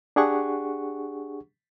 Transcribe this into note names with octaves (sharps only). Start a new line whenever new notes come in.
D4 G4 G#4 F#5 C#6